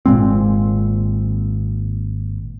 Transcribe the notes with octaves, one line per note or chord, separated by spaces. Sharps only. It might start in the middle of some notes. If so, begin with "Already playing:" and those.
G#1 A#2 G#3 C4